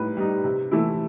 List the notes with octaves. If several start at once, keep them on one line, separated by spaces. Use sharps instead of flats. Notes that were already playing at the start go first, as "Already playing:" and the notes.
Already playing: A2 G3 D#4 B4
G3 D#4
C3
E3 A3 E4